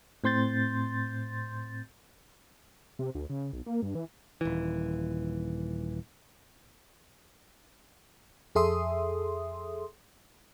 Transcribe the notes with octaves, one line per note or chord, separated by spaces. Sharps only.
A2 C4 C6 G6 A6
C3
D2
C#3
B1
A#3
G2
E3
D#1 E3
F2 G#4 A4 E5 C6 D#6